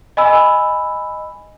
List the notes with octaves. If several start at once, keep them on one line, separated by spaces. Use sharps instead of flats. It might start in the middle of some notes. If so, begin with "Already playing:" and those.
D#5 G#5 B5 E6